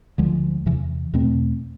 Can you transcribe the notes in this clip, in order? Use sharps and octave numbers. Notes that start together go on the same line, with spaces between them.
D2 D3 F3 G#3
E2 C3 E3
E2 B2 A3 C4